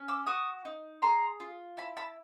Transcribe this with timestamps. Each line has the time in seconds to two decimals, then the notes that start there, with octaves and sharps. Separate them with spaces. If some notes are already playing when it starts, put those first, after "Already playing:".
Already playing: C#4
0.08 D6 E6
0.26 F#4 C#6 D#6
0.65 D#4
1.02 G#4 A#5 C6
1.40 F4
1.77 E4 A5 B5
1.97 A5 B5